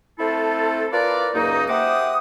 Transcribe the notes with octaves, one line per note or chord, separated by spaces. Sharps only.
A3 C4 E4 F4 A4
F4 A#4 B4 D5
C#2 F#2 A#3 D#4
G4 C5 E5 F#5 D6 D#6